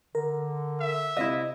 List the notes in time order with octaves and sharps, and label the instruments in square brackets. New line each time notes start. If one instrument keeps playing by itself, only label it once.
[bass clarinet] D3 [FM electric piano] A#4
[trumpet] E5
[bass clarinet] C3 [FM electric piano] C4 F5 [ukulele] E4 D#5